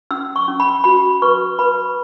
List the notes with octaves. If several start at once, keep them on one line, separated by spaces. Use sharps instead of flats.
C#4 E6
C#6
C#4
B5
F#4 B5
B4 C#6
B4 B5